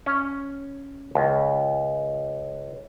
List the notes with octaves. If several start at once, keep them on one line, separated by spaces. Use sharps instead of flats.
C#4
C#2